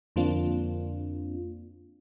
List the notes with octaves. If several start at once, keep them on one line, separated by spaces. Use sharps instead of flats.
F2 D3 A#3 C4 D4 F4